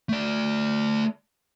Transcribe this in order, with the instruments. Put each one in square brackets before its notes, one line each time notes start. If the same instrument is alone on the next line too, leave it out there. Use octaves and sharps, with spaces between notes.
[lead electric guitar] A3 D5